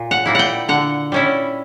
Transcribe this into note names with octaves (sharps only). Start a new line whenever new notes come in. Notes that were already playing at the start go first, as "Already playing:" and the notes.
Already playing: A#2
F#5
G3 A#3 E4
F#5 G5
D3 F#5
G3 C#4 E4